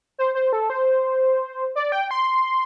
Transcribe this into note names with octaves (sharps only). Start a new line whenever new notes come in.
C5
C5
A4
C5
D5
G5
C6